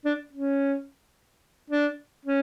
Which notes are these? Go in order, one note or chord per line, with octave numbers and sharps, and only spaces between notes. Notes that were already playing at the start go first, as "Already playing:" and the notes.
D4
C#4
D4
C#4